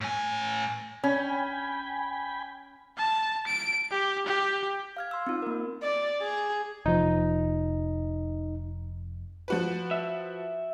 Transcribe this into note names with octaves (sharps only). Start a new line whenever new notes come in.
A2 G#5
C#4 G5 G#5 B5
A5
D7
G4
G4
F5 F6 G#6
C6 E6
C4 D#4 F4
A#3 A#4
D5
G#4
F1 F3 D#4
F3 F#4 B4
E5